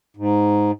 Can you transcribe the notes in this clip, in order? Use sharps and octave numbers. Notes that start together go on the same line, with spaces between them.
G#2